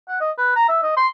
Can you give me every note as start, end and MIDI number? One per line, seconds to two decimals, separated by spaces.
0.09 0.18 78
0.21 0.31 75
0.38 0.55 71
0.56 0.68 82
0.69 0.78 76
0.83 0.94 75
0.97 1.08 84